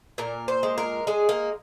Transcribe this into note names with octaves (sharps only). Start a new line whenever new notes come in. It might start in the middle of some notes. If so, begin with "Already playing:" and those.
A#2 A#4
C5
G#3
A#4
G#3 G#4
A#3